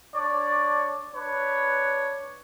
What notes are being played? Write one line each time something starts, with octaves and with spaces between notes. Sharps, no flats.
D4 C#5 D5
D4 B4 C#5